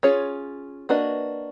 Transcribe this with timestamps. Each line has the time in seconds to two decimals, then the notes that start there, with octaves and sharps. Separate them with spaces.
0.03 C#4 F4 G#4 C#5
0.89 A#3 D4 F#4 B4 D#5